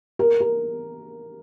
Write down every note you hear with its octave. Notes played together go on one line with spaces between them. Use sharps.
A#4
A#4